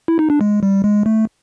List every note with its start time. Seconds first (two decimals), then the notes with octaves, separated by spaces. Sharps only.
0.08 E4
0.19 D#4
0.30 D4
0.41 G#3
0.63 G3
0.84 G#3
1.06 A3